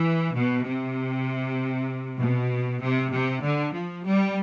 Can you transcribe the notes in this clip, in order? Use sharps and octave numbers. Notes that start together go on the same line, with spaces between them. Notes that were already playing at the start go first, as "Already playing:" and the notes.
Already playing: E3
B2
C3
B2
C3
C3
D3
F3
G3